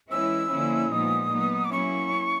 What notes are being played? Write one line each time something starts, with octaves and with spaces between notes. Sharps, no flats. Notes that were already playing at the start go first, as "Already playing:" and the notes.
E3 G#3 C#4 E4 E6
D3 F3 A#3 C#4 E4
A#2 F3 G#3 B3 D#4 D#6
F#3 B3 D#4
D6
F#3 A#3 C#4 E4 C#6